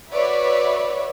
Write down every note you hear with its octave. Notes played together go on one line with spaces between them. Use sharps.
F#4 B4 C#5 D5 E5